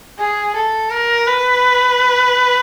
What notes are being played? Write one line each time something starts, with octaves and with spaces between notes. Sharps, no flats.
G#4
A4
A#4
B4